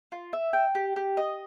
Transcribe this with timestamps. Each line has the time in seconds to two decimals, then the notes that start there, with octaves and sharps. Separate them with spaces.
0.12 F4
0.33 E5
0.53 G5
0.75 G4
0.96 G4
1.17 D#5